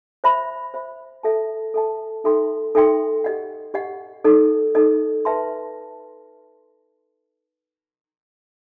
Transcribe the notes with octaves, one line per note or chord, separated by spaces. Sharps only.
C5 E5 B5
C5 E5 B5
A4 E5 A5
A4 E5 A5
D#4 A4 E5 G5 C6
D#4 A4 E5 G5 C6
G4 D#5 F#5
G4 D#5 F#5
D#4 A4 D#5
D#4 A4 D#5
B4 E5 A5 C6